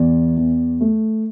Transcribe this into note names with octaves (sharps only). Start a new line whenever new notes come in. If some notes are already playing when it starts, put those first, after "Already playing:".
Already playing: E2 E3 D5
E2
A3